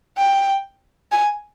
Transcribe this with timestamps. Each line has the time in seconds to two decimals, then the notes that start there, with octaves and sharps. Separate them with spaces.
0.17 G5
1.12 G#5